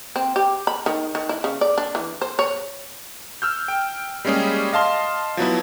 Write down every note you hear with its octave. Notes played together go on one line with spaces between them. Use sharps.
C4
G4
B5
D#3
D#3
E4
C#3
D5
D4
E3
C5
C#5
E6 F6 G6
G5
G3 G#3 A#3 C#4 G4 G#4
D#5 F5 A5 C6
F3 F#3 B3 E4